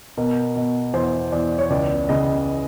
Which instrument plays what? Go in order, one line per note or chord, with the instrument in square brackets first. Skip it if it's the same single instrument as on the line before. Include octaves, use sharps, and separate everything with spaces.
[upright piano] B2 A#4
B2
E2 C5
E2 D5
C#5
C#2 D5
C#3 D#5